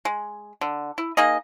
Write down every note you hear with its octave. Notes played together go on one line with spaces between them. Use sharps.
G#3
D3
E4
A#3 D#4 G#4 D#5